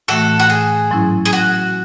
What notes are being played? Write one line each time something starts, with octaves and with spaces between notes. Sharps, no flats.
A2 E3 A3 F#4 A4
F#4
G#4
G#2 F#3 C#4 E4
G#4
F#4